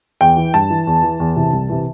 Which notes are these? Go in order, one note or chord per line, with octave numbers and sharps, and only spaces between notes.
E2 G5
E3
G2 A5
E3
E2
E3
E2
C3 E3
C2
C3 E3